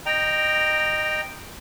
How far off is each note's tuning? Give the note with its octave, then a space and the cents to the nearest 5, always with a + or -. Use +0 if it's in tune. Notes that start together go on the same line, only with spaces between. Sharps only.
D#5 -20 G5 +0 A#5 +0